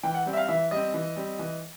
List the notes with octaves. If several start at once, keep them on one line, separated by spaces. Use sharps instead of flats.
E3 G5
F#5
G3 C4
E5
F5
E3 E5
G3 C4 D#5
E3
G3 C4
E3